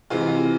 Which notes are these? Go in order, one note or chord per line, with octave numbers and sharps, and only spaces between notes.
C3 E3 G#3 F4
F4